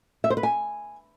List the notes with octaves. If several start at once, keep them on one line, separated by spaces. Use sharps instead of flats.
E5
C5
B4
G#5